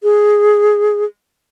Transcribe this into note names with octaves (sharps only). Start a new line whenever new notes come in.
G#4